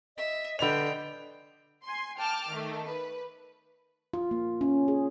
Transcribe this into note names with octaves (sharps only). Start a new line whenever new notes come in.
D#5 E5
D3 B4 D5 D#5 G5 B5 F7
G#5 C6
G5 A5 D6 F6
D#3 A3
B4
F4
A#3
C#4
G#4